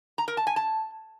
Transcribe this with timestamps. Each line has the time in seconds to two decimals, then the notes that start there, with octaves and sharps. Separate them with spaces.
0.18 A#5
0.28 A#4
0.37 A5
0.47 G#5
0.56 A5